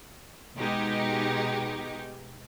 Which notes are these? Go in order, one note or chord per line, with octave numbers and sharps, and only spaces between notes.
B2 G#3 D#4 G4